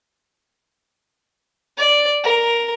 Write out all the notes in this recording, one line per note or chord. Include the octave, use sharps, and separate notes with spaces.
D5
A#4